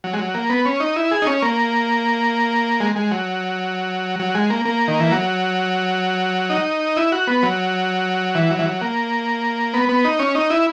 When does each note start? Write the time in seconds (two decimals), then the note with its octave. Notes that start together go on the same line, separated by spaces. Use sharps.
0.04 F#3
0.13 G#3
0.19 F#3
0.34 A#3
0.50 B3
0.65 C#4
0.80 D#4
0.96 E4
1.11 G#4
1.22 D#4
1.27 C#4
1.42 A#3
2.80 G#3
2.96 G#3
3.11 F#3
4.19 F#3
4.35 G#3
4.50 A#3
4.65 A#3
4.88 D#3
5.00 E3
5.12 F#3
6.50 D#4
6.97 E4
7.12 F#4
7.27 B3
7.43 F#3
8.35 E3
8.50 F#3
8.59 E3
8.65 F#3
8.81 A#3
9.74 B3
9.89 B3
10.04 D#4
10.19 C#4
10.35 D#4
10.50 E4